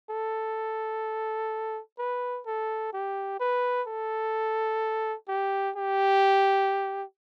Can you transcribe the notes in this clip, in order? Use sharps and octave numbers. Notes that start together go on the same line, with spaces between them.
A4
B4
A4
G4
B4
A4
G4
G4